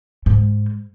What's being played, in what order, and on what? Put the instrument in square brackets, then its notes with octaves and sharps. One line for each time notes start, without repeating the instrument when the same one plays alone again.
[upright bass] G#2